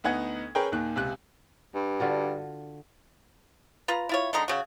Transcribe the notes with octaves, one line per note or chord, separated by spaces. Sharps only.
D2 B3 D#4 F#5 G#6
C#4 G#4 A#4 B4 C#5 G5
D#2 A#2 D#3 F#6
C#2 C3 F#6
G2
D3 F4 F#4
F4 B4 A#5
E4 F4 C#5
D3 G#3 D#4 A#5
C#3 F#4